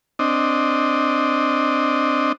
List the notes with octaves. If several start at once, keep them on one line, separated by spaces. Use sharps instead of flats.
C4 D4 D#5